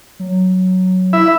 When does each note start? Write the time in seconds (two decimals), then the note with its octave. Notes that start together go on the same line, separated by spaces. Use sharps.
0.19 F#3
1.13 E4 E5 B6